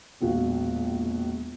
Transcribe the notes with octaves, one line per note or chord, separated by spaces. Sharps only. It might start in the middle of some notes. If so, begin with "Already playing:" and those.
E1 A#1 F#4 F5